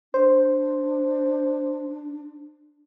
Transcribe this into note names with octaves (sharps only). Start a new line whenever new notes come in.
D4 C5